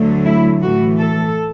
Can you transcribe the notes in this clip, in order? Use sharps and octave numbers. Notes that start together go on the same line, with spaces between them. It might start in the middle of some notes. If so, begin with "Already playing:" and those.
Already playing: D2 D3 F#3 A3
E4
A2 E3 A3 F#4
A4